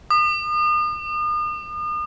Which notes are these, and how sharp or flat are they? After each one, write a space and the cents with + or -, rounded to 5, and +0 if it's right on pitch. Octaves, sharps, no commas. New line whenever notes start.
D#6 -40